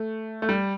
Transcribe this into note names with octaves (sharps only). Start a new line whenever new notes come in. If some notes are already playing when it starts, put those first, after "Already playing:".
Already playing: A3
A3
G3